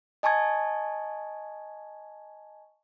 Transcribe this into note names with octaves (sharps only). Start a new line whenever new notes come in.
D#5 G#5 A5 C#6 G#6